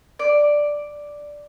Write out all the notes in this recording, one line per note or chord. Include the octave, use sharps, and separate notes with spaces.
D5